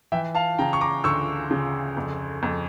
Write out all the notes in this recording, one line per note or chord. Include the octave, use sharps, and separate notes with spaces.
E3 E5 G5
F5 A5
C#3 G5 A#5
C#6
A#5 D6
D2 C#6 E6
C#3
F2
F2